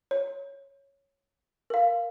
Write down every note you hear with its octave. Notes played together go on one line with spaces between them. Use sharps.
C#5
A#4 F5